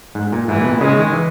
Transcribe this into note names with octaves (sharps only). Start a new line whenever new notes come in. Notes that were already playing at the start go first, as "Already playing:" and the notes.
G#2
A#2
G#2 E3
A#2
B2
A#2
C#3 G#3
D#3
E3